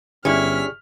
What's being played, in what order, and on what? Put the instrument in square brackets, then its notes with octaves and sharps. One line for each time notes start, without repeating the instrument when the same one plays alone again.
[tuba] G1 [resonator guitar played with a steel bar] C#4 E4 [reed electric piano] G4 G#4 D5 [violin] F6 B6